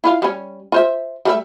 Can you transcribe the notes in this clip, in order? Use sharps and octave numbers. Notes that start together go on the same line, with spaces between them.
E4 F4 F5
G3 C#4
F4 C5 E5
G3 A3 E5